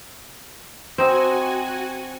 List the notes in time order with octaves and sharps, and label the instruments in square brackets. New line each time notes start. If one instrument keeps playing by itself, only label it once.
[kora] C4 D#4 [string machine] F#4 G#5